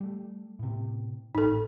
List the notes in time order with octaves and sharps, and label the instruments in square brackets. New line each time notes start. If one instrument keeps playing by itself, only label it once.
[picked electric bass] G3 A3
A2 C3
[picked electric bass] G#1 A2 [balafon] D#4 A4